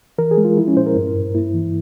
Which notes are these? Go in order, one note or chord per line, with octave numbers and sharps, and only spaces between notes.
E3 A#4
G#4
G#3
F4
F3 E4
C#4
A#2 C5
A#4
G2
G2
A#3 E4
E3